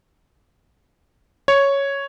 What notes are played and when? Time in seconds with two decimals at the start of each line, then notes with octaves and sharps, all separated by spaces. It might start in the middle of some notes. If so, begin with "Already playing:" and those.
1.48 C#5